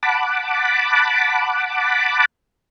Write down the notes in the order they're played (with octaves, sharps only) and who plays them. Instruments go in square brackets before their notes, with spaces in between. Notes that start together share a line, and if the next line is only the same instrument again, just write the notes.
[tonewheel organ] F#5 A5 B5 D6